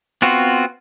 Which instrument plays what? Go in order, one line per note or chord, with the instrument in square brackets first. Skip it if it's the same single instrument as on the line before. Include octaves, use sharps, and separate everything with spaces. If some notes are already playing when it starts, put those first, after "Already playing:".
[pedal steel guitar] B3 C4 F4 F#4